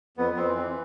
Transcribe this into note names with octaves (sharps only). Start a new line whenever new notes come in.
F2 B3
F2 C4
E3
E3 C4